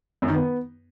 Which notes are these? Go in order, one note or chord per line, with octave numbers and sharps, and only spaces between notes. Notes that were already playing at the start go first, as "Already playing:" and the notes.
F#2
D#3
B3